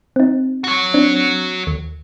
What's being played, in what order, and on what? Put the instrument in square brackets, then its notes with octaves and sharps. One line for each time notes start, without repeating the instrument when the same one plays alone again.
[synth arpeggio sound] C4 D#4
[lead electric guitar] F#4 C#5
[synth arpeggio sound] C4 D4
D#2